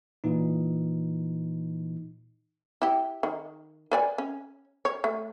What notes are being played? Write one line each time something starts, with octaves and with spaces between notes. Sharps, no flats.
A#2 E3 D#4
E4 G4
D#3
B4 D5 G#5
C#4
C#5
A3